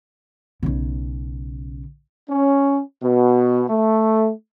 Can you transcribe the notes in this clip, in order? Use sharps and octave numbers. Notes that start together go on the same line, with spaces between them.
B1 C#3
C#4
B2
A3